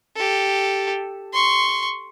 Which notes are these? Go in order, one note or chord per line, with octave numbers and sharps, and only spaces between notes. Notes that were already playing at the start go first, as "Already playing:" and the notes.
G4 A4
C6 C#6